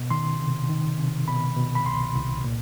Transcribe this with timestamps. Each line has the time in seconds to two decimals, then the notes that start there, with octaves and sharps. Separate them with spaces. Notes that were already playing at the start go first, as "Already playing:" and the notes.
Already playing: B2
0.10 D#3 C6
0.40 C3
0.69 D#3
0.98 C3
1.28 B2 B5
1.57 B2
1.75 B5
1.86 C2 C6
2.15 C2
2.44 A#2